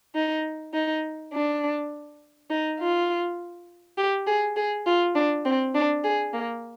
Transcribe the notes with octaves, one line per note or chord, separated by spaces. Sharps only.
D#4
D#4
D4
D#4
F4
G4
G#4
G#4
F4
D4
C4
D4
G#4
A#3